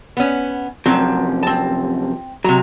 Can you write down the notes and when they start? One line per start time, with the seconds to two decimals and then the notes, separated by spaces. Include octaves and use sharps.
0.17 B3 C#4
0.86 F#2 C3 F3 F#3 C4
1.43 C4 A5
2.44 C3 F#3 A#5